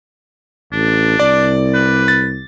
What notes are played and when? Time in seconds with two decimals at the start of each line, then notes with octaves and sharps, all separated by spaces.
0.73 A1 D4
1.20 C2 D5
1.74 B4
2.08 A6